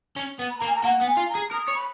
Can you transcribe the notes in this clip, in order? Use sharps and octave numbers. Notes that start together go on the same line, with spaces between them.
C#4
B3
B5
A#5
A#3
G#5
A#5
A#3 F#5
B3
G#5
F4
A#5
G#4
A#4 D#6
C#5
B5